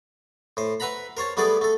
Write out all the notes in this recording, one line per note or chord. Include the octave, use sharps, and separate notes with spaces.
A2 C5
B4 E5 F#5 A#5 B5
A#4 C5 C#5 A5
G3 A3 B3 G#4 A4 D5
A3 A4